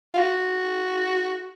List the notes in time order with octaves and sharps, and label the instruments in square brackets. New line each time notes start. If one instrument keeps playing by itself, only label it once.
[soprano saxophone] F4
F#4